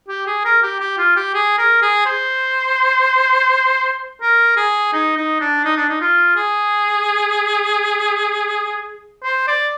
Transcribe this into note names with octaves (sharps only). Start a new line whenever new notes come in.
G4
G#4
A#4
G4
G4
F4
G4
G#4
A#4
G#4
C5
A#4
G#4
D#4
D#4
D4
D#4
D4
D#4
F4
G#4
C5
D5